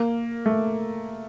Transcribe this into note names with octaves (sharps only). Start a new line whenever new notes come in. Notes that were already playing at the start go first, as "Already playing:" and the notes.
Already playing: A#3
A3